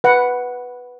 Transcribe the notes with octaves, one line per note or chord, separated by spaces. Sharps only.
B4 F#5